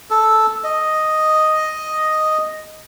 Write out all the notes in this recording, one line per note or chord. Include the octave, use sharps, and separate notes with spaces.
A4
D#5